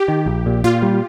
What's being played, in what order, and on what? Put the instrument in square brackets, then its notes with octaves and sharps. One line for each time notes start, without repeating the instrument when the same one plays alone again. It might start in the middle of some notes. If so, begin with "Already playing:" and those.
Already playing: [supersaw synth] G4
[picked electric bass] D#3
A#1
A#2
[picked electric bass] A#2 [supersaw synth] F4
[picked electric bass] G3